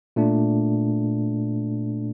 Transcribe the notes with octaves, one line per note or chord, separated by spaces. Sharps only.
A#2 A3 D4